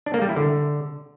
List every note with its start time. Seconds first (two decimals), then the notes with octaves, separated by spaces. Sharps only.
0.06 D4
0.14 A#3
0.21 G3
0.29 E4
0.36 D3